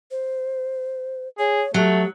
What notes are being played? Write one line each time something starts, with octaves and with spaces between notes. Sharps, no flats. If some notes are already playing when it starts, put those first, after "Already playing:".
C5
G#4 C#5
F#3 A3 G4